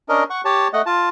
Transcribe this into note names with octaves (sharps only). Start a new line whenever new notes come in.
C#4 D4 A#4 D#5
F#5 C#6
G4 C#5 A5
A3 D#5 F#5
F4 A5